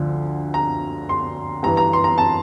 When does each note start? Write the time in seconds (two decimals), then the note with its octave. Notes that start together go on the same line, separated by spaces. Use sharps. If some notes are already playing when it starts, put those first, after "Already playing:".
Already playing: D2 D3 F3
0.54 A#5
1.09 C6
1.63 G2 E3 A#5
1.77 A#5
1.93 C6
2.04 A#5
2.18 A5